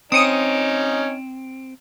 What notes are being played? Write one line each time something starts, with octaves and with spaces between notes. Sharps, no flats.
C4 C#4 D#4 D#6 C#7 D#7